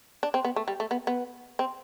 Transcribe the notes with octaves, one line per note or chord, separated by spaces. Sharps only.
D4
C4
B3
A3
G3
A3
B3
B3
C4